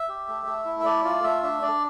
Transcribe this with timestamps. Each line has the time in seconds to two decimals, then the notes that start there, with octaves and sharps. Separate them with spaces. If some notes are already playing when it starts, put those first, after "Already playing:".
Already playing: E5
0.09 G4
0.28 A3
0.46 A3
0.65 E4
0.80 E5
0.85 A3 D5
1.04 F4 D5
1.23 A3 E5
1.43 D4 E5
1.62 D4 D5